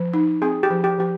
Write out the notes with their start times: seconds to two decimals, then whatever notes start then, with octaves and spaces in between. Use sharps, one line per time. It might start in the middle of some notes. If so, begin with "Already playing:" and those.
Already playing: F3
0.14 D#4
0.42 C4 G#4
0.63 G4
0.70 F3
0.84 G4
0.98 F3 G4